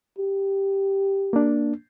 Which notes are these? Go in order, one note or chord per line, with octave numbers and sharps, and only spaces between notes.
G4
A#3 D4